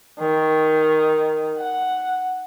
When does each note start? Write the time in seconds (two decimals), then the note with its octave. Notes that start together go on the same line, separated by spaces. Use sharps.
0.20 D#3
1.59 F#5